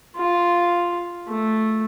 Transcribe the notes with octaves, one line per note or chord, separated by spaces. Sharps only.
F4
A3